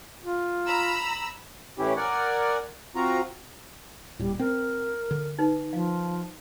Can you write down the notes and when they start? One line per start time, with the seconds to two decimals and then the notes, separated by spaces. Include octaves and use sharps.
0.22 F4
0.66 A#5 B5 E6
1.79 A2 E3 C#4 E4 G4
1.97 A#4 D5 F#5 G#5
2.96 C4 F4 F#4 A#5
4.19 D#1 A2 G3
4.39 C4 A#4
5.11 D3
5.39 D#4 B4
5.73 F3 F5